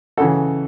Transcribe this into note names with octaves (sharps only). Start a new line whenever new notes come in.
F#4 A4
C#3 E3